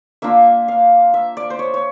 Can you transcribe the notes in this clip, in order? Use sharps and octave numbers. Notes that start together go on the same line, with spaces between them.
A#3 D4 F4 E5
F5
E5
D5
C5
C#5
C#5